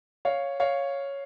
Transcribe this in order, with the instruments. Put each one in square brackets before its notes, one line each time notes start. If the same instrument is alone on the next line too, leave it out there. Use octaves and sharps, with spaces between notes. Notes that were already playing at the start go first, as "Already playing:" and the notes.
[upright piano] C#5 F5
C#5 F5